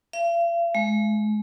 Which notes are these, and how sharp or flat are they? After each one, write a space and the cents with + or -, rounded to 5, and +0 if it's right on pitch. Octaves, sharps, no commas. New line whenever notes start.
F5 -45
G#3 +35